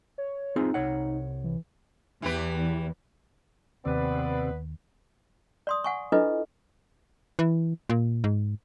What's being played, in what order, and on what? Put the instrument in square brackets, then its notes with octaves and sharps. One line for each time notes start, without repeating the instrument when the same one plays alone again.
[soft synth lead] C#5
[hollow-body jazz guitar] C4 F4 G#4 [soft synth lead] D#4
[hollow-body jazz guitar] C2 C#5 F#5
[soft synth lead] E3
[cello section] E2 [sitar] E3 G4 B4
[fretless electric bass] D#2 [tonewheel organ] C3 C4 [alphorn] B3 [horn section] B4 D5
[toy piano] D5 C6 D#6
F#5 G#5 C#6
D4 E4 F4 A4 B4 D#5
[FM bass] E3
A#2
G#2